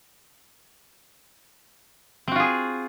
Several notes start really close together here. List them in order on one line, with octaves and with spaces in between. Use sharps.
C4 F#4 F4 G#4